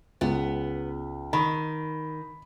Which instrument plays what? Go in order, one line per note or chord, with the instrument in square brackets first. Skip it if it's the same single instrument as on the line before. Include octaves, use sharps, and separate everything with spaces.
[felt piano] C#2 [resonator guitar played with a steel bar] B3
[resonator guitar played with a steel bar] D#3 [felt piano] B5